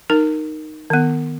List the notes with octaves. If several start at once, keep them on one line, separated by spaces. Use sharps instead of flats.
D#4 A#4
D#3 B3